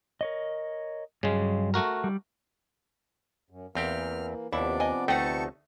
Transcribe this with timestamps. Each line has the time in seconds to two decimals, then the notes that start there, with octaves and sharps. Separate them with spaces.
0.21 A#4 C#5 D#5
1.23 G2 C#3 F#3 G#3
1.74 A3 F#4 A#4
2.04 G3
3.50 F#2
3.75 E2 E3 A#3 C4 G4 F6
4.53 D#2 C3 F3 B3 D4 E4 D5
4.80 D#5 G#5
5.08 D2 A3 D#4 A4 F#5 G5 A5 C#6